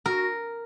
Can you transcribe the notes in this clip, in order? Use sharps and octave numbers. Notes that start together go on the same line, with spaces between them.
F#4 A#4